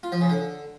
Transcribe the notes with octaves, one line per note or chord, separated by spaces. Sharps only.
F4
F3
C#3
D3